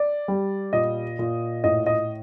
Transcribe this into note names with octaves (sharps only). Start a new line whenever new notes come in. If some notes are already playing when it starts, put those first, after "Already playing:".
Already playing: D5
G3
A#2 D#5
A#2
A2 D#5
D#5